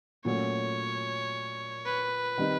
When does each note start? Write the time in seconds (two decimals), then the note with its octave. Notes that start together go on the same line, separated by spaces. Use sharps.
0.25 A#2 F#3 A3 C#4 C#5
1.85 B4
2.38 D#3 G3 C4 D#4